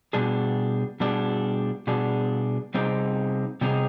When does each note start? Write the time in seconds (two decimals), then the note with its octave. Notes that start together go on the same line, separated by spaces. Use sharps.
0.13 B2 G3 D4 G#4
1.00 B2 G3 D4 G#4
1.87 B2 G3 D4 G#4
2.74 C3 G3 C4 D#4 G#4
3.61 C3 G3 C4 D#4 G#4